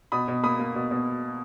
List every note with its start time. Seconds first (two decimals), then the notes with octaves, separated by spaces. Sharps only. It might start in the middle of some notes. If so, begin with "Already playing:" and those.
0.12 B2 B5 D#6
0.28 B2
0.43 A#3 B5 D#6
0.59 A#3
0.75 B2
0.91 B2